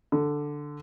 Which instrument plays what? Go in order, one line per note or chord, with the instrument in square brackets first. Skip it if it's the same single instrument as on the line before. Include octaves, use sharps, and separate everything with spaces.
[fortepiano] D3